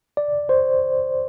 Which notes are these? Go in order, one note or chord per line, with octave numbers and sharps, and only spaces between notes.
D5
C5